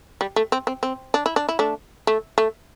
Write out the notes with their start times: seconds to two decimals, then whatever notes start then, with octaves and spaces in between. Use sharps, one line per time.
0.21 G3
0.36 A3
0.52 C4
0.67 C4
0.83 C4
1.14 D4
1.26 E4
1.36 D4
1.49 E4
1.59 A3 D4
2.07 A3
2.38 A3